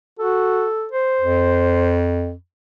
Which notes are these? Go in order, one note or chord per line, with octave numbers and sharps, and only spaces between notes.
F#4 A4
C5
F2